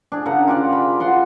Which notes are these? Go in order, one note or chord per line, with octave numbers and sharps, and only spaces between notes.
D4 G#4
C#3 A#4 F#5
F4 G4 D5
B5
F4 F#5 C6